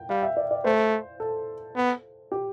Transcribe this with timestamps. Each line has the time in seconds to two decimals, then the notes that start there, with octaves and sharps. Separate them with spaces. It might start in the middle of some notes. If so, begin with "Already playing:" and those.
Already playing: G5
0.09 G3 F5
0.23 E5
0.37 D5
0.51 D5
0.64 A3 C5
1.20 A4
1.76 B3
2.32 G4